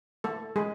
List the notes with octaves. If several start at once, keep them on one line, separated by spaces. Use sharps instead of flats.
A3 A4
G#3 G#4